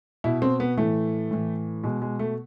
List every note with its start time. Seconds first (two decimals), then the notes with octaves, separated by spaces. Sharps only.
0.24 B2 E4
0.42 C4
0.60 B3
0.77 A2 E3 A3
1.31 A2 E3
1.84 B2 G#3
2.02 G#3
2.19 A3